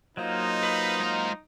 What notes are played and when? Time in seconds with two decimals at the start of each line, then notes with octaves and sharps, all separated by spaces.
0.17 F#3 A#3 D#4 F4 C5 D#5
0.63 B4
1.00 G#3 A#5